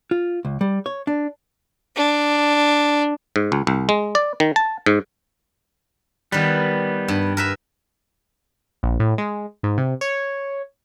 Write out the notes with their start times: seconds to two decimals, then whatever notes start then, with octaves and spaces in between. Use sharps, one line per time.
0.11 F4
0.45 C#2
0.61 G3
0.86 C#5
1.07 D4
1.96 D4
3.36 G#2
3.52 C#2
3.67 C2
3.89 G#3
4.15 D5
4.40 D#3
4.56 A5
4.86 G#2
6.32 D#3 G3 B3 B4
7.08 G2
7.37 A#4 B4 E5
8.83 A#1
9.00 A2
9.18 G#3
9.63 G#2
9.78 C3
10.01 C#5